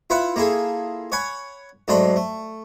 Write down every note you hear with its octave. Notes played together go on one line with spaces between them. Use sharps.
E4 F4 B4 E5 F#5 B5
A#3 E4 F4 G#4 A4
C#5 F#5 G#5 B5
G#2 F#3 A3 D4 B5 C6
A3